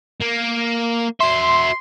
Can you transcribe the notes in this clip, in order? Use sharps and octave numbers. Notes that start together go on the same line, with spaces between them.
A#3
F#4 E5 C6